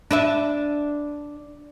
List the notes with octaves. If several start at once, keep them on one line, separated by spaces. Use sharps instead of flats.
D4 B4 E5